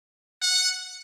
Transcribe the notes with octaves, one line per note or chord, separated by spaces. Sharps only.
F#5